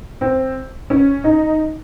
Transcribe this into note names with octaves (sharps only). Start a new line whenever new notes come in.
C4
C#4
D#4